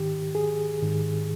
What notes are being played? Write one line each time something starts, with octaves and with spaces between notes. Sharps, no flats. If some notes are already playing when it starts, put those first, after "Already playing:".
Already playing: G#2 D#3 G4
G#4
G#2 D#3